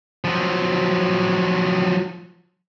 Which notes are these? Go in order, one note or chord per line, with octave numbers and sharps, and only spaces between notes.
F3 F#3